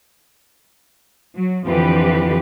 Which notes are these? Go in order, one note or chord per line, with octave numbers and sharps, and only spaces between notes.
F#3
F2 D3 E3 F3 G4 B4